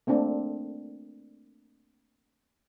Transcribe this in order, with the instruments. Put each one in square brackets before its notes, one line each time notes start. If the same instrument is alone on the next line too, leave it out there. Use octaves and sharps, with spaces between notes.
[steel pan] A3 A#3 C4 D4